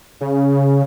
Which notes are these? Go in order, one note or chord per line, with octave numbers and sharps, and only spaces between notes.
C#3